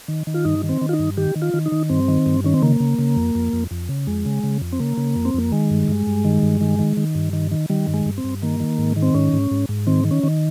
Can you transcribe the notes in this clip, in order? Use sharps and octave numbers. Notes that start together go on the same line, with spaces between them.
D#3
D#3
F4
G2 D#4
D#3
C4
D#3
F4
D#4
G2
D#3 G4
D#3
F4
D#3
D#4
D#3
G2 C4
D#3
G2
D#3 C#4
C4
C#3 A#3
C#3
C#3
F2
F2
F2
F2
C#3
F2 G#3
C#3
C#3
F2
C4
C#3 A#3
C#3
F2
C4
F2 A#3
D#3 G#3
G2
G2
G2
D#3
G2
D#3
D#3
D#3
G2
D#3
D#3
D#3 G3
G2
G#3
G2
C4
G2
D#3 A#3
D#3
G#2
D#3
C4
G#2 C#4
G#2
G#2
G#2
D#3 C4
D#3
C#4
D#3